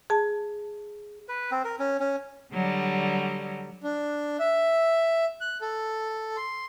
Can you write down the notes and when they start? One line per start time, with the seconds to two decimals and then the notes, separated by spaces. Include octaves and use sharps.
0.10 G#4 A5
1.28 B4
1.51 C4
1.65 A#4
1.79 C#4
2.00 C#4
2.53 D3 F#3 G3
3.83 D4
4.40 E5
5.41 F#6
5.61 A4
6.37 C6